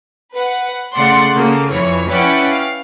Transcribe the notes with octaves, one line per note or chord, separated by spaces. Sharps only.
B4 F#5
C#3 A3 D5 F#5 C6
C#3 A#3 A4
F2 E3 C#5
C#4 E4 B4 D5 F#5 G5
F5